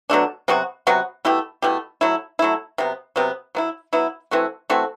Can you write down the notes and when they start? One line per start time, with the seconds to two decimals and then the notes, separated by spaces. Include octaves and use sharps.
0.10 B2 F#3 A3 D4
0.48 C3 F#3 B3 F#4
0.87 C3 F#3 B3 F#4
1.25 B2 A3 E4 G4
1.62 B2 A3 E4 G4
2.01 F#3 A3 E4
2.39 F#3 A3 E4
2.78 C3 F#3 B3
3.16 C3 F#3 B3
3.55 F#3 B3 E4
3.93 F#3 B3 E4
4.31 E3 A3 C4 F#4
4.70 E3 A3 C4 F#4